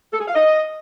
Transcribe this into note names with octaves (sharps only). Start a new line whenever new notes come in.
A4
G#4
F5
D#5